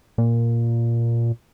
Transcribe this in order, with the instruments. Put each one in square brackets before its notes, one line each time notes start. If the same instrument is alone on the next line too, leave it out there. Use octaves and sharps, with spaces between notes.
[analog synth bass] A#2